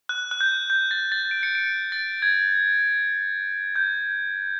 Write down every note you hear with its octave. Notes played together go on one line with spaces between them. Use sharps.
F#6
F#6
G6
G6
A6
A6
D7
C#7
D7
A6
G#6
G6